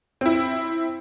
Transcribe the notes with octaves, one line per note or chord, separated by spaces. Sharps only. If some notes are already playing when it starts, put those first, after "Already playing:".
C4 E4